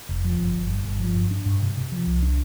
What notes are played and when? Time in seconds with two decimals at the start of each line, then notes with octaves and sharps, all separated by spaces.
0.09 F1
0.25 F3
0.39 G1
0.55 G1
0.70 G2
0.85 G1
1.00 F3
1.15 G2
1.31 D4
1.46 G2
1.61 C3
1.77 C3
1.92 F3
2.06 C2
2.22 D4